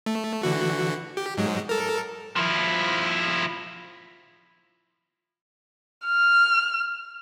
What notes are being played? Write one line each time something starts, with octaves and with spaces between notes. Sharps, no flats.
A3
D3 E3 F#4
G4
G#2 F#3 G#3
A4 A#4
F3 E4
F6